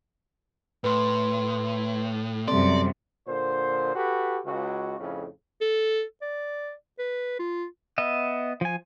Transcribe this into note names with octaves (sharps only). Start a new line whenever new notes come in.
A2 B4 C6
F#2 C3 G3 A4 D5 C6
A#2 D3 C5
F#4 G4 A4 B4
C#2 F#4
F2 A2 C#3
A4
D5
B4
F4
B3 D#5 E5
F3 G#5